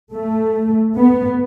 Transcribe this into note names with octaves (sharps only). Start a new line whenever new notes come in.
A3
B3